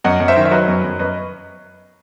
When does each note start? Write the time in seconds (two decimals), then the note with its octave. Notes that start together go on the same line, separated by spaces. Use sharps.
0.04 F#2 D#5 F#5
0.20 F#2
0.28 C5 E5
0.36 D#3
0.45 E5
0.51 F#3 B4 D#5
0.68 F#2
0.84 F#2
0.99 F#2 B4 D#5